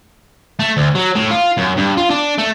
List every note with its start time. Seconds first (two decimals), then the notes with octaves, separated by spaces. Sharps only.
0.60 A3
0.77 D2
0.95 F#3
1.16 A2
1.31 F4
1.58 F#2
1.77 G2
1.97 F4
2.10 D4
2.38 A3